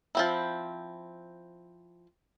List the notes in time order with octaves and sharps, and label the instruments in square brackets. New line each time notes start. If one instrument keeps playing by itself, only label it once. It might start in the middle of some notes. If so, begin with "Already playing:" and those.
[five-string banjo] F3 C4 E4